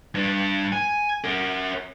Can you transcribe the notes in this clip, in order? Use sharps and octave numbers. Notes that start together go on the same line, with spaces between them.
G2 D4
G#5
C#4 A#4